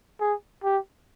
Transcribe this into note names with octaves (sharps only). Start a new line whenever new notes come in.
G#4
G4